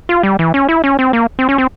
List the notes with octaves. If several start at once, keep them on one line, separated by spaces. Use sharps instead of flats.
F4
G3
E3
C#4
E4
C#4
C4
A#3
C4
C#4
C4